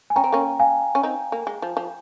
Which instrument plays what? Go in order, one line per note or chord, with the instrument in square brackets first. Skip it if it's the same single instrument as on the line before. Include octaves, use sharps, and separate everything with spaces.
[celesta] G#5
[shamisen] C#4 [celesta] G5 A#5
[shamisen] C4
A#3 C#4
[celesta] F5 G#5
[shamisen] C#4
C4 D#4
A#3
G#3
F3
F3